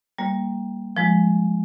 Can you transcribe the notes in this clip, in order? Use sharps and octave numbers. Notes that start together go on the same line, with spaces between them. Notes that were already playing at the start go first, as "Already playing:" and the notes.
G3 A#3
F3 G#3